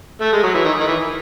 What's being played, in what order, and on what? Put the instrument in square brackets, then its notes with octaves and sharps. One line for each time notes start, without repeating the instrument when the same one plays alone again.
[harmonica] A3
G#3
F#3
E3
D#3
D#3
E3